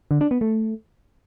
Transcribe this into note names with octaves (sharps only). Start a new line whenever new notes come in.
D3
D4
B3
A3